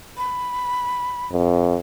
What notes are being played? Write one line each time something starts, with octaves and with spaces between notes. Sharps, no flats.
B5
F2